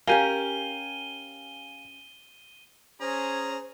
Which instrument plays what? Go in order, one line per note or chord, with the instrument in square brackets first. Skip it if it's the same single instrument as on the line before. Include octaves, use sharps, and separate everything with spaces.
[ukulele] C#4 G4 A#4 [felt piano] F5 G#5 [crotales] D#7 G7
[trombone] C#4 [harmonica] G#4 [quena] C5 [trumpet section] A#5